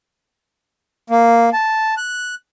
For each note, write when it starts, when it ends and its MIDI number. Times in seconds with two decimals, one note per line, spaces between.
1.10 1.50 58
1.53 1.95 81
1.97 2.35 90